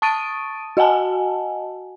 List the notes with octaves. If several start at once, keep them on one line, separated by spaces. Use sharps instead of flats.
A5 C#6 D#6 A6 D7 D#7
F#4 D#5 F#5 G#5 A5